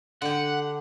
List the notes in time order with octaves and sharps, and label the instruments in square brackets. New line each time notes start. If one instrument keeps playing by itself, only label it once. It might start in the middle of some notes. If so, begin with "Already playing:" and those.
[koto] D3 G4 [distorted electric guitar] F#5